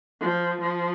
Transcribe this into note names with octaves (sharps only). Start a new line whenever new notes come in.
F3
F3